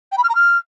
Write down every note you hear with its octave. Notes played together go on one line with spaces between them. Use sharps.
G5
B5
F6
A#5
F6